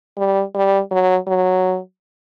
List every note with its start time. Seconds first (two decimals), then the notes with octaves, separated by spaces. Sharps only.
0.17 G3
0.54 G3
0.91 F#3
1.27 F#3